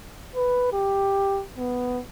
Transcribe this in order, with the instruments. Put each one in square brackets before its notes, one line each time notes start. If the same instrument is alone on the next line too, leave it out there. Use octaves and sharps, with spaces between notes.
[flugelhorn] B4
G4
B3